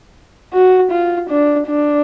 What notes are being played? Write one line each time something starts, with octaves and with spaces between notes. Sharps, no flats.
F#4
F4
D4
D4